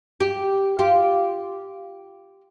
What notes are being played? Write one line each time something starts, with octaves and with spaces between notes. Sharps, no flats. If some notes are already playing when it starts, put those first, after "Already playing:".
G4
F4 G4